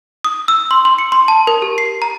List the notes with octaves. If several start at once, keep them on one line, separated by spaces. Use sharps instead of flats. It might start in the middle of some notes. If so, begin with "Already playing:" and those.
D#6
E6
C6
C6
C#7
C6
A5
A#4
G4
C7
A#5